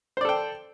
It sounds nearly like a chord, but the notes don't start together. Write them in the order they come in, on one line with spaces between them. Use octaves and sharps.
C5 D5 A4 G5